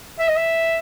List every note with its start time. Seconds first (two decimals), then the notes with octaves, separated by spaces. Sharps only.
0.19 E5
0.28 D#5
0.36 E5